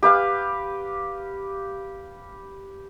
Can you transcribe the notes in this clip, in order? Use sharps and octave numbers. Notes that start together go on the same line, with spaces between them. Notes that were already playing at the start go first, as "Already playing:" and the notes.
G4 B4 F5